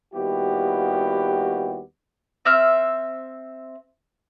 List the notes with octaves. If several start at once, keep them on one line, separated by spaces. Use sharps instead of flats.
D#2 G3 B3 E4 F#4 G4
C4 E5 F6